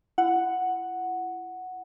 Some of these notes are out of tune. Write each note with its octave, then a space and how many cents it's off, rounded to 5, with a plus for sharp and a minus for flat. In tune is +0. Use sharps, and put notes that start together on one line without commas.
E4 +35 F#5 +0